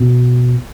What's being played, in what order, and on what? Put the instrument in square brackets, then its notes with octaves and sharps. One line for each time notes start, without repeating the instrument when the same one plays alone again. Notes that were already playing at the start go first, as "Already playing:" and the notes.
Already playing: [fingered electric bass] B2